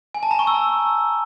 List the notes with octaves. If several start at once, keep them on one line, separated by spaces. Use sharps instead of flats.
G#5
A5
A#5
C#6
E6